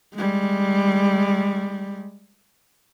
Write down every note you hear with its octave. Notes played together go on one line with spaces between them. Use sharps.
G3 G#3